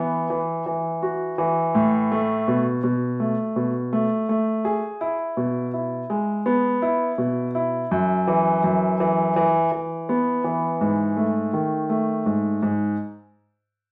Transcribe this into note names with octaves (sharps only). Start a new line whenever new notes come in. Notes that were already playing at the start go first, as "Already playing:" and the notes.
Already playing: E3 B3
E3
E3
F#4
E3
A2
A3
B2
B2
A3
B2
A3
A3
G#4
E4
B2
E4
G#3
B3
E4
B2
E4
F#2
E3
F#2
E3
E3
E3
B3
E3
G#2
A3
D#3
A3
G#2
G#2